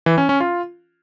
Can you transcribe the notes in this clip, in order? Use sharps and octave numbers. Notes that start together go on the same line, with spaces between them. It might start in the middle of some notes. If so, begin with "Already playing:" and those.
E3
C#4
C#4
F4